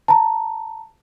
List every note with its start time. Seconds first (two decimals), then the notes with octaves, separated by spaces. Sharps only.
0.08 A5 A#5